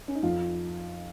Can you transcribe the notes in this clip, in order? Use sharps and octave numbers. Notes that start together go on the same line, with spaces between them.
C#4
D#4
F2 F4